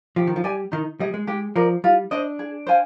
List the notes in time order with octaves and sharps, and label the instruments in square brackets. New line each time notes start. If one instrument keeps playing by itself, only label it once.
[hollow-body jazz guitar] F3 [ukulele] G4
[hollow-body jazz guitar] D#3
F3
[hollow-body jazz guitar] G3 [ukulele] D5 G#5
[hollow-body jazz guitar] D#3 [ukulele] D#4
[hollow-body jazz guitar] G3 [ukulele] G#4 D#5
[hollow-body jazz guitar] G#3
[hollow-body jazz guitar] G#3 [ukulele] G4
[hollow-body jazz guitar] F3 [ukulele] A#4 D5
[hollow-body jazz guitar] G3 [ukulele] F4
[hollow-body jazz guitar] D4 [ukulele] C5 D#5
[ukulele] G#4
C5 F5 G#5